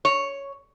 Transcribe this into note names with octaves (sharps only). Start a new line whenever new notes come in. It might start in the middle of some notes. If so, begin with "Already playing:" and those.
C#5